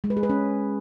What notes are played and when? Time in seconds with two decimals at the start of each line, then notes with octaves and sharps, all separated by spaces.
0.04 G#3
0.10 B4
0.17 G#4
0.23 B4
0.30 C#4